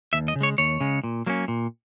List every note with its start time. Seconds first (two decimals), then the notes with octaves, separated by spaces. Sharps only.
0.13 D#2 E5
0.28 D#5
0.35 C#3
0.41 G#3 C#5
0.58 D#2 C#5
0.80 C#3 G#3
1.04 A#2
1.26 F#3 A#3 C#4
1.48 A#2